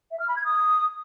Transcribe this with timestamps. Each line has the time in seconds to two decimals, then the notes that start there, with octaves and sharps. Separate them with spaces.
0.11 E5
0.20 F6
0.28 B5
0.36 G#6
0.45 D#6